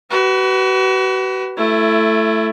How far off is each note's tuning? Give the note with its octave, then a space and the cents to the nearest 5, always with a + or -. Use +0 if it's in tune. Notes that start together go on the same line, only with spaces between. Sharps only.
F#4 +35 B4 +0
A3 +0 E4 +25